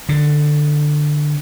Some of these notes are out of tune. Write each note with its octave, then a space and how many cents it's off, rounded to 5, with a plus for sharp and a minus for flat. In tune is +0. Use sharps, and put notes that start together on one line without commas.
D3 +15